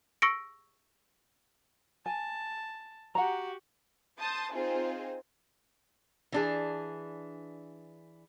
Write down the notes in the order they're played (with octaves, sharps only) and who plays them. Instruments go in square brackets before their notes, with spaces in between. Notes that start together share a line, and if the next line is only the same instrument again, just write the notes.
[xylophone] C#6 E6 A#6 C#7 D7
[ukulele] G#5 [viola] A5
[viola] F#4 G4 [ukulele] F#5 A#5
[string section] A5 C6 D#6 G6 A6
C4 D#4 F4 G#4 C5
[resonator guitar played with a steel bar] E3 D4 G#4